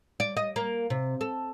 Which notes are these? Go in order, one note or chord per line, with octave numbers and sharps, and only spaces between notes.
D5
D#5
A#3
C3
A4